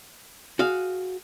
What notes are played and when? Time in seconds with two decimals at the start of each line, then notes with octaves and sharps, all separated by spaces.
0.59 F#4 G#4 F5